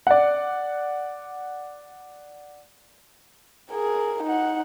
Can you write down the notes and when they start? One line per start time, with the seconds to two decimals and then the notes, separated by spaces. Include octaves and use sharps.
0.07 D5 F#5
3.71 G#4 A#4
4.23 D#4 F#5